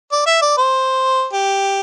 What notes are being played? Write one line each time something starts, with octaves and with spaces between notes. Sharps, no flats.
D5
E5
D5
C5
G4